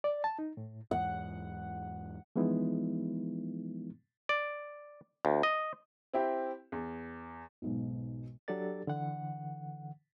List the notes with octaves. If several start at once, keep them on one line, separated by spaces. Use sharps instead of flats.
D5
A5
D#4
A2
E2 G#2 F#5
E3 F3 G#3 B3 D#4 E4
D5
D2
D#5
C4 E4 G4
E2
B1 G#2 B2
F#3 D4 G4 A4 D5 A6
D3 E3 F#5